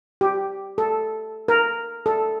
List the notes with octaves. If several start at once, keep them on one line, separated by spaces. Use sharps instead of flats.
G4
A4
A#4
A4